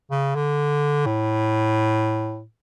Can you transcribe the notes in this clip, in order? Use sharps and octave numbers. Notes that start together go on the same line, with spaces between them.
C#3
D3
A2